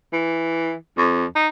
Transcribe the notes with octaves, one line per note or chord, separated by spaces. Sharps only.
E3
F2
D#4